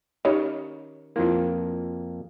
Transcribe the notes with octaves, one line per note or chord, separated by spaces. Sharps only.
D#3 C#4 D#4 G4 C#5
F2 A#3 E4 F4